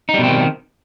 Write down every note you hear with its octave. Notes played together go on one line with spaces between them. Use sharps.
B2 D#3 G3 C4 D#4